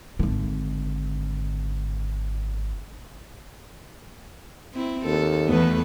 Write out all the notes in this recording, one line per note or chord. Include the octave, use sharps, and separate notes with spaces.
G#1 D3
C4 E4
D#2 A4
E2 A3 B3 B4